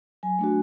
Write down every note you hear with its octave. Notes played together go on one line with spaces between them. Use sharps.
F#3 G#5
A3 D4 F#4